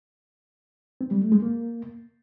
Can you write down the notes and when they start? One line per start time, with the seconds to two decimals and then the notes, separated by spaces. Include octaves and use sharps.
1.01 C4
1.11 G3
1.21 A3
1.32 G#3
1.42 A#3